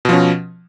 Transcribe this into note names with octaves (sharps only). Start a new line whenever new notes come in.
B2 F3 C#4